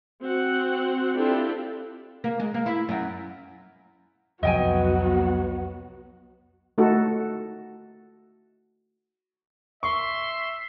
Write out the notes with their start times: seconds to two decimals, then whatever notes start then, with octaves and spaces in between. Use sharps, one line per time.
0.22 C4 F#4 F#5
1.17 C4 D4 E4 F4 G4 A4
2.24 A#3
2.40 G#3
2.54 A#3
2.66 E4
2.89 F#2
4.43 C2 F2 F#3 B3 F#4 D#5 G5 G#5
6.78 A3 D#4 F4 F#4 A4
9.83 E5 C6 C#6